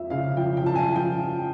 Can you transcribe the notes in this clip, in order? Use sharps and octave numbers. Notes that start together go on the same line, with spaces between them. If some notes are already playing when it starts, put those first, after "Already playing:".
Already playing: F2 F3 E5
C#3 F5
F3 G5
G5
F3 A5
G#5
F3
G5